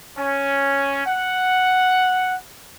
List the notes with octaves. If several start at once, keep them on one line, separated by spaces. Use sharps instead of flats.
C#4
F#5